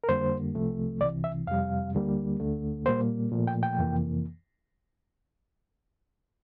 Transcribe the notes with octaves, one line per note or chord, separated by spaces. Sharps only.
A#4
F2 D3 G3 A#3 C5
C2 C3 F3 A3
C2 C3 E3 D5
E5
F2 C3 G3 F5
D2 D3 G3 A#3
D2 D3 A3
A#2 G3 A#3 C5
A#2 F3 A3
G5
G5
F2 C3 E3 A#3